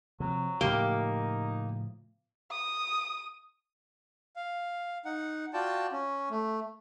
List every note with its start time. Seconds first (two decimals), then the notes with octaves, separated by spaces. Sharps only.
0.20 C3 F3 F#3
0.61 A2 C#3 F3 A#3 D#4 G4
2.51 D#6
4.36 F5
5.05 D#4 F#5
5.54 F4 F#4 D5 G5 A5
5.92 C#4
6.30 A3